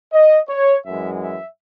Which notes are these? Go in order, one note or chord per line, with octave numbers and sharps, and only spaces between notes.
D#5
C#5
F#2 E3 G#3 E5
E5